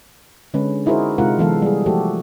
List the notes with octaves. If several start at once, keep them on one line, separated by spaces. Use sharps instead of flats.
D3 G#3 C#4 B4
D#4 E4 F#4 G#4 A#4 C5
C3 G#3 D#4 F4 A#4 F#5
E3 F#3 G#3 B3 A4 F5
G3 G#4
F3 A3 F#4 G4 A4